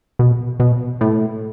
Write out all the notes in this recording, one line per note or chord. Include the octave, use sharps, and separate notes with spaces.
B2
B2
A2